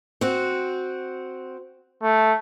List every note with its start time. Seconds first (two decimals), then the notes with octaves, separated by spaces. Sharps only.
0.21 C4 F#4
2.03 A3